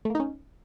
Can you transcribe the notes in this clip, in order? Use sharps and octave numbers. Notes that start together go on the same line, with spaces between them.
A3 A#3 C#4 D#4